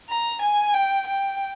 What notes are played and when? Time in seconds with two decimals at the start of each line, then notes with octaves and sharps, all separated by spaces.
0.10 A#5
0.42 G#5
0.74 G5
1.07 G5